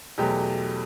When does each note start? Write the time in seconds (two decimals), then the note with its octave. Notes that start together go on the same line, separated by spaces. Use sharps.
0.18 E2 B2 F#3 A3 G4